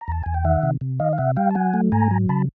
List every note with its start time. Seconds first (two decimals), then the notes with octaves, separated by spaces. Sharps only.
0.01 A#5
0.08 E2 A5
0.23 E2 G#5
0.34 G5
0.45 D#3 E5 F#5
0.63 C3
0.81 C3
1.00 D#3 D#5 F5
1.13 F5
1.18 C3 E5 F#5
1.36 G3 F5 G5
1.51 A5
1.55 F#3 F#5 G#5
1.74 A3
1.92 G#2 G#5 A#5
2.11 F#3
2.29 C#3 A5 B5